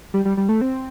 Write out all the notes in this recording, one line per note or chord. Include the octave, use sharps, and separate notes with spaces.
G3
G3
G3
A3
C4